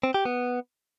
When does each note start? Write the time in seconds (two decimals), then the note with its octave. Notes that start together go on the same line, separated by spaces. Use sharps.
0.03 C4
0.14 G4
0.25 B3